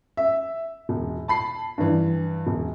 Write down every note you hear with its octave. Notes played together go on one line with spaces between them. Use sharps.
E5
E1
A5 B5 C7
G2 E3
E1